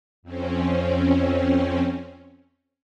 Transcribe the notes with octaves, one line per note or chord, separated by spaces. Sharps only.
F2 C4 C#4